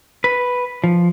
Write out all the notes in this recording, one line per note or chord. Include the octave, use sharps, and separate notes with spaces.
B4
F3